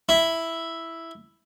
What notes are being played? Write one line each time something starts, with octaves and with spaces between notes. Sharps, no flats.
E4